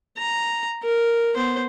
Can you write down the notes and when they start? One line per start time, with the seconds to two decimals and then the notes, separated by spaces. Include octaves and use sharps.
0.18 A#5
0.83 A#4
1.35 B3 C5